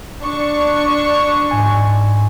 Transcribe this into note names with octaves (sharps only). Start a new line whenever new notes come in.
D4 C#6
G#2 G#5